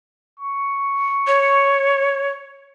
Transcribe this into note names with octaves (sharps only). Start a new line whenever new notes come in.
C#6
C#5